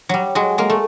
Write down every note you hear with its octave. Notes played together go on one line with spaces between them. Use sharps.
F#3 G3
F#3 G#3
G#3 A#3
A3